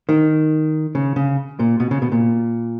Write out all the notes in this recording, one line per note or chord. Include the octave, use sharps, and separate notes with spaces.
D#3
C#3
C#3
A#2
B2
C#3
B2
A#2